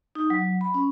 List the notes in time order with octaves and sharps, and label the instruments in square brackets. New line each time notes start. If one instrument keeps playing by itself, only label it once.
[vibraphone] D#4
F#3
B5
C#4